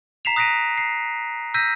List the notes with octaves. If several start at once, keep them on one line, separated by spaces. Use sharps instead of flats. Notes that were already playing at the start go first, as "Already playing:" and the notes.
A#5 B6 C7 E7 F7
D#6 F#6 A#6 B6 D7 D#7
C7
E6 G6 A#6 B6 D#7